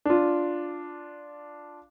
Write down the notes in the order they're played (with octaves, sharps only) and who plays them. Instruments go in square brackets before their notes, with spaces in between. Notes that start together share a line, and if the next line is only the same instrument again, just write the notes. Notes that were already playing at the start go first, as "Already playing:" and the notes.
[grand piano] D4 F4